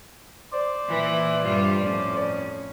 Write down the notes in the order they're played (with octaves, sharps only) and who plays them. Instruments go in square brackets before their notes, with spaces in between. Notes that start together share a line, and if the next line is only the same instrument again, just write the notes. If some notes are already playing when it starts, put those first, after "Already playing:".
[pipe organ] C5 D5
[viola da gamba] A#2 E3 E4
G2 G3 F4
F2 A2 C#4